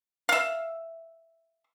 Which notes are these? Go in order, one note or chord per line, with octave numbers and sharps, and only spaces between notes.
E5 F5